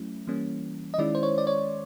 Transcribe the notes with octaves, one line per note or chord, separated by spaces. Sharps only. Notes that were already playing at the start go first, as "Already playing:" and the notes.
Already playing: F#3 A3 C#4 E4
E3 G3 A#3 C#4
D#5
D#3 G#3 C#4 E4 D5
C5
C#5
D5
C#5